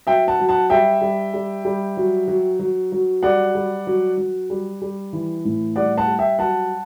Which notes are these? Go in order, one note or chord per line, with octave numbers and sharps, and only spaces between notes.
F#3 E5 G5
F#5 A5
F#3
F#5 A5
G3 E5 G5
G3
G3
G3
F#3
F#3
F#3
F#3
G3 D5 F#5
G3
F#3
F#3
G3
G3
E3
A2
G3 D5 F#5
F#5 A5
G3
E5 G5
F#3 F#5 A5